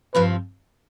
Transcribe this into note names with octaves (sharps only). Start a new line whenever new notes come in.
G2 F3 C4 B4